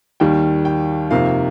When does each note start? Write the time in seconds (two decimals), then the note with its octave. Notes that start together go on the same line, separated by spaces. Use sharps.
0.20 D#2 D#3 G3 G5
0.65 G5
1.11 F2 C3 D#3 A#3 F5